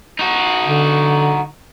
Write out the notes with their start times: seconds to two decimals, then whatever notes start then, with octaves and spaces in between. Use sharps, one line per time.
0.19 D#4 F#4
0.64 D3